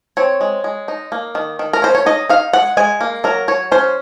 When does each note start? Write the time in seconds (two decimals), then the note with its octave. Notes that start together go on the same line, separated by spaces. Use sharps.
0.17 C4 C#5
0.41 G#3
0.64 G#3
0.88 D#4
1.12 A#3
1.35 D#3
1.59 D#3
1.73 A#4
1.82 C#4 C5
1.95 C#5
2.06 D#4 D#5
2.29 D#4 F5
2.53 G#3 F#5
2.77 G#3 G#5
3.01 A#3
3.24 F#3 A#4
3.48 F#3 C#5
3.72 C#4 C5